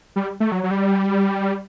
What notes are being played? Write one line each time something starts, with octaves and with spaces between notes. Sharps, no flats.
G3
A3
F#3
F#3
G3